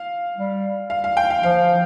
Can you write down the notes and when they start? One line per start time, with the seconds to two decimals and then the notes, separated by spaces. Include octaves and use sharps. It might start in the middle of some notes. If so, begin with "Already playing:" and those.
Already playing: F5
0.36 G3
0.90 F5
1.04 F5
1.17 G5
1.30 F5
1.43 F3 F5